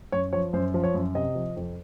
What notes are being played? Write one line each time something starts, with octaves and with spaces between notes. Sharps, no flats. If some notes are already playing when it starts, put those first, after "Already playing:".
F#2 C#5
F3 C#5
F#2 C5
F3
C#5
F#2
C3 D#5
F3
F2